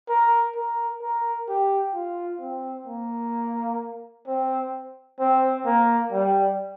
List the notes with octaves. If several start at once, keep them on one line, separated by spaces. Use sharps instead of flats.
A#4
A#4
A#4
G4
F4
C4
A#3
C4
C4
A#3
G3